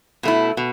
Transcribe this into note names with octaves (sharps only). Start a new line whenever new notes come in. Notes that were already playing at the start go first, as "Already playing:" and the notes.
B2 A3 E4
B2